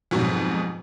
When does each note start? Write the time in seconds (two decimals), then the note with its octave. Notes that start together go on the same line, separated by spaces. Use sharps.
0.11 F2 G#2 B2 F#3 G3